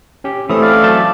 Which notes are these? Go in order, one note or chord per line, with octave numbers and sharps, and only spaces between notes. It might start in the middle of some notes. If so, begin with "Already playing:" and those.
C#4 G4
E3 A3 C4 C#4 D#6
D5 F5
F#3 E5 A5 G6 A6